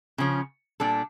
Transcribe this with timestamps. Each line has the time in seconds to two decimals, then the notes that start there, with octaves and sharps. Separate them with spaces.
0.18 C#3 F3 C#4
0.80 A#2 G3 D4 A4